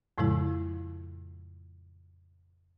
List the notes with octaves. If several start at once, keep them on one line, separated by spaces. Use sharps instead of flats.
F2 A2 C#3 F3 G#3 E4